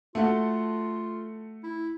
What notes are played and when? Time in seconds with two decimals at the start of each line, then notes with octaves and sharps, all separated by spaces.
0.15 A3 F4 F#4 A4
1.64 E4